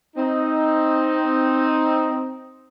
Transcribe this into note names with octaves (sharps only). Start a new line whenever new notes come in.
C4 D#4